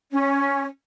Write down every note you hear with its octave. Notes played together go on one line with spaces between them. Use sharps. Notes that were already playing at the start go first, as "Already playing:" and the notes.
C#4